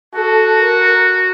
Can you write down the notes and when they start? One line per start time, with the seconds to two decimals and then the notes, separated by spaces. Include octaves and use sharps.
0.14 F#4 A4
0.60 A#4